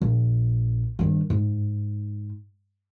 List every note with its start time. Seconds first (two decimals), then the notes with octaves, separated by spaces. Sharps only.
0.02 A#1
0.99 G2 D#3
1.30 G#2